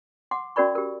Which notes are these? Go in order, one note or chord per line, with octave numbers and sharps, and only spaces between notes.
F#5 C6 D6
C#4 F#4 A#4 D5 B5 C#6
G4 A#4